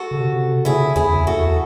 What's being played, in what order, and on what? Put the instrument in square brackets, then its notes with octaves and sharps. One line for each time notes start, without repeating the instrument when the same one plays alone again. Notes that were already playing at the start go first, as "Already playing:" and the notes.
Already playing: [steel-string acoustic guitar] F#4 A4
[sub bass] C#3
C3
[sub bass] C#3 [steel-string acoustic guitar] E4 G#4
[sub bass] E2 [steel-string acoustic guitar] E4 G#4
[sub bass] E2 [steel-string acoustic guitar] F#4 A4